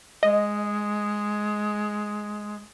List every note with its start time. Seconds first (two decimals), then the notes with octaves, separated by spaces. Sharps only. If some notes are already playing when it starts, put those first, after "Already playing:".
0.23 G#3 D#5